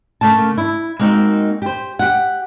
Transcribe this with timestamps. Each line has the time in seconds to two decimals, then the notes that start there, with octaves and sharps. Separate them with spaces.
0.21 C#3 A3 A#3 A5
0.58 E4
0.99 G#3 A#3 C4 D#4 F#4
1.62 G4 C5
1.99 G4 F#5